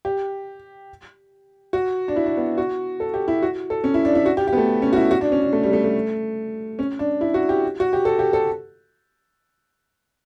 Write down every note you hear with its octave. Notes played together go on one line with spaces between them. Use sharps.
G4
F#4
D4
E4
D4
B3
F#4
A4
G4
E4
F#4
A4
C#4
E4
D4
E4
F#4
G4
G4
B3
A3
C#4
F#4
E4
F#4
D4
C#4
D4
A3
G3
A3
A3
C#4
D4
E4
F#4
G4
F#4
G4
A4
G4
A4